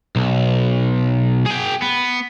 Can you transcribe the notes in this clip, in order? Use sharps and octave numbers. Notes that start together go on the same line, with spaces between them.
B1
G#4 G5
B3